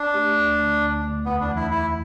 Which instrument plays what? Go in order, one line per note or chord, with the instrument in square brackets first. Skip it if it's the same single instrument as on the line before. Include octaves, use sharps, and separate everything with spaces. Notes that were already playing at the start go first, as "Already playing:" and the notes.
Already playing: [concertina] D4
[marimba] A3 G4
D2
D3 A3
D2
D3 A3
[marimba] E2 [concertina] B3
[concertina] D4
[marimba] E3 A3
[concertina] E4
[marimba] E2 [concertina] E4